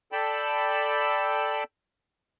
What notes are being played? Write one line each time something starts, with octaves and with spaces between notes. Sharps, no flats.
A4 D5 G5 A5 B5 E6